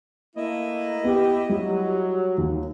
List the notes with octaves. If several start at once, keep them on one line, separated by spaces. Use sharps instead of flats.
A3 A#3 E4 D#5
B3 G4
F#3 G3
D#2